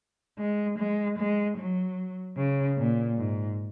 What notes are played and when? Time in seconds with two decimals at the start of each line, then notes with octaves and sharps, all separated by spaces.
0.39 G#3
0.79 G#3
1.18 G#3
1.58 F#3
2.37 C#3
2.77 A#2
3.17 G#2